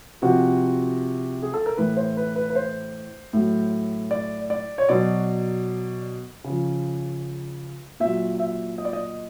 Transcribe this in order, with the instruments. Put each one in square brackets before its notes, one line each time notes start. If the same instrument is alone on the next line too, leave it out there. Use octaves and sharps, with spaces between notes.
[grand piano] C3 F3 F#4
G#4
A4
A#4
A2 E3 B4
C5
B4
B4
B4
C5
A2 F#3
D5
D5
C#5
B2 F#3 D5
C#3
F3
A#2 F#3 E5
E5
D#5
D5
D#5